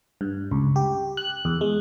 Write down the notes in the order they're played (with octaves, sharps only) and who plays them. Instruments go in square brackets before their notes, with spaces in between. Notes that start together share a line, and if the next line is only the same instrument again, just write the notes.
[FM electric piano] G2
C#2
G4
F#6
E2
G#3